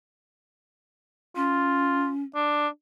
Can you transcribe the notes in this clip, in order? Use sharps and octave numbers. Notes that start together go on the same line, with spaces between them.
C#4 F4
D4